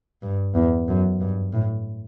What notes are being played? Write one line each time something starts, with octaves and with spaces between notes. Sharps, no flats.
G2
E2
F#2
G2
A2